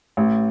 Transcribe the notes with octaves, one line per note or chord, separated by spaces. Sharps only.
A1